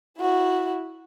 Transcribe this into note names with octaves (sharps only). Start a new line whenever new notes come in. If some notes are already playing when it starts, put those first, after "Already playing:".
E4 F#4